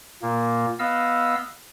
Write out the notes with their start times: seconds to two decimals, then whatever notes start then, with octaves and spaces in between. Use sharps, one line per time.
0.22 A#2 A#3
0.79 B3 D#5 F5 E6